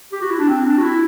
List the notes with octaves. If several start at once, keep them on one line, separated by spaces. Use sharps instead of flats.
G4
F#4
E4
D4
C4
D4
F#4
E4